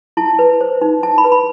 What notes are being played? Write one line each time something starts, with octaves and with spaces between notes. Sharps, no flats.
E4 A5
B4
C5
D#4
E4 A5
B5
B4
B5